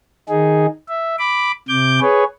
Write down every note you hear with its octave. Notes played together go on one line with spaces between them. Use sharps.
D#3 D#4 G#4
E5
B5 D6
C3 D6 G6
G#4 B4 C#5